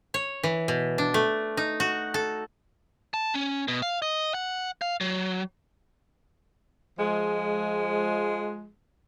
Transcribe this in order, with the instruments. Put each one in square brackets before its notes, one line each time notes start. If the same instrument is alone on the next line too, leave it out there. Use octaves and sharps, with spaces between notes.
[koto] C#5
E3
B2
D4
A3
D#4
F#4
A4
[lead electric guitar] A5
C#4
B2
F5
D#5
F#5
F5
F#3
[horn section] F3 G#3